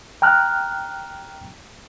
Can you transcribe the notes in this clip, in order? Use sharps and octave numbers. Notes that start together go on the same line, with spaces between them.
G5 A#5 F6 F#6